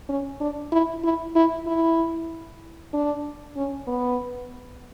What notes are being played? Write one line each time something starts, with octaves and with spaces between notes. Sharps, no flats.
C#4
D4
E4
E4
E4
E4
D4
C#4
B3